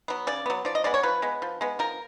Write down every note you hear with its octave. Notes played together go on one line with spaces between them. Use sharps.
F#3 B3
C#3 D5
F#3 B3
F3 D5
D#5
G#3 B3 D5
C#5
F3 B4
G#3 B3
F3
G#3 B3
F3 A#4